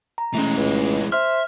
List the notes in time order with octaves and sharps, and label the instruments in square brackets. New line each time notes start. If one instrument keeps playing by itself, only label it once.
[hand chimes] A#5
[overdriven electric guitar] E3 G#3 [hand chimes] A3 C#4
[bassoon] C#2
[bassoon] C5 [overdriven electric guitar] E5 [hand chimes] F6